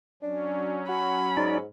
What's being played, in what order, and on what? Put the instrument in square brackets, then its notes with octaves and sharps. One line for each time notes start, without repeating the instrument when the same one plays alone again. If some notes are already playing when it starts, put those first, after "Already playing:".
[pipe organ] F#3 C#4 [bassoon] D4
[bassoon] F#4 [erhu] B5
[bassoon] G#2 [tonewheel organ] D#4 D5